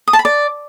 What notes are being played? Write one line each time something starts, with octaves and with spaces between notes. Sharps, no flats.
D#6
A5
B5
D5